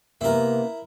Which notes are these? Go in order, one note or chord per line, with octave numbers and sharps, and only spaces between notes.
C3 A#3 B3 E4 A#4